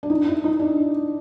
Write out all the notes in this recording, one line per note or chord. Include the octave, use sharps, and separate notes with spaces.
D4
D#4
E4
D#4
D4